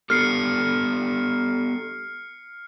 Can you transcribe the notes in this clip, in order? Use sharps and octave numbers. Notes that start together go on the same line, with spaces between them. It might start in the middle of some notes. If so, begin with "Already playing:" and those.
B3 G4 A4 F6 C7 C#7